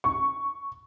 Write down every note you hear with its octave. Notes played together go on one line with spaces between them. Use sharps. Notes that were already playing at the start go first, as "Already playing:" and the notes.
C#6